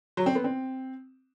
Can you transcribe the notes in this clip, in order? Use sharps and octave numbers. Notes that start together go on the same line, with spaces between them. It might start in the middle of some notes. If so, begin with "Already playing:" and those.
F#3
C4
B3
C4